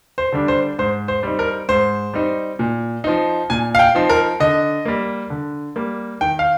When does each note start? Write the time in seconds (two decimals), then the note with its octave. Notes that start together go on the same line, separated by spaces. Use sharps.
0.18 C5
0.33 D3 G3 D4
0.48 C5
0.79 G#2 C5
1.08 C5
1.23 G3 C4 D#4
1.39 A#4
1.69 G#2 C5
2.14 G3 C4 D#4
2.59 A#2
3.04 F3 C4 D#4
3.50 A#2 G#5
3.75 F5
3.79 G5
3.95 F3 C4 D#4
4.09 A#4
4.40 D3 D#5
4.85 G3 A#3
5.30 D3
5.76 G3 A#3
6.21 D#3 G5
6.39 F5